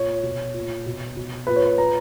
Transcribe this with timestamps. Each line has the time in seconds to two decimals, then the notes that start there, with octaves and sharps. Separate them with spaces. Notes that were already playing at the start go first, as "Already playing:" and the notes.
Already playing: A#2 C#5
0.23 B2
0.54 A#2
0.86 B2
1.17 B2
1.47 A#2 B4
1.56 C#5
1.66 B4
1.78 A#2 A#5